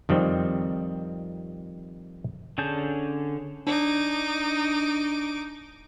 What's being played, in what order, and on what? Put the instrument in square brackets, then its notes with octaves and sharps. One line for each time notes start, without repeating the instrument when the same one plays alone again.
[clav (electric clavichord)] F2 D#3 G3 C4
[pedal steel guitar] D3 C#4 G#4 A5 G6
[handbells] D4 [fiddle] D#4 D6